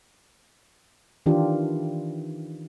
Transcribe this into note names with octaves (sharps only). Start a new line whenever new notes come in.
D#3 E3 D4 F4 G4